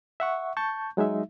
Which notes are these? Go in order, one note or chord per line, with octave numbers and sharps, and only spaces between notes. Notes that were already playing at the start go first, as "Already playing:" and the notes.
E5 F#5 C#6
A5 C#6 G6
F#3 G#3 D#4 E5